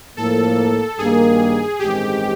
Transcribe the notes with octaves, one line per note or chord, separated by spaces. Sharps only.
A2 F3 A#3 A4
G2 D#3 G3 A#3 G#4
A1 G2 D#3 G#3 C4 G4